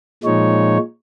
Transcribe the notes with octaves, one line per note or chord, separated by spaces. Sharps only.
A#2 F3 G#3 D#4 C#5